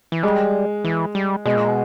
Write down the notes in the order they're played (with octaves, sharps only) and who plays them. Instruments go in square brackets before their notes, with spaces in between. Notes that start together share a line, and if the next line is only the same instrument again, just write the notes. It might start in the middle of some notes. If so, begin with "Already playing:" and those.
[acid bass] E3
[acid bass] G3 [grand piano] G#3
[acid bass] E3
G3
[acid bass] B2 [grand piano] G#3
[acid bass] A#2
B2